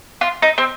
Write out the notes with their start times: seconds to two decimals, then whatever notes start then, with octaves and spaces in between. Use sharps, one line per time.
0.21 F4
0.42 D#4
0.58 C4